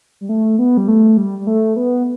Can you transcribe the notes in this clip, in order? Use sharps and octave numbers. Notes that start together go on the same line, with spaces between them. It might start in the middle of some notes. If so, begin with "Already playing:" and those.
G3
A3
B3
G3
A3
G3
G3
A3
B3